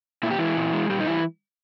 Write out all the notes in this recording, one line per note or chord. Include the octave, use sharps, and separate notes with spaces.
A#2 E4
G4
E3 G#3 E4
A#2
G#3
A#2 G3 G4
D#4
E3 G3 E4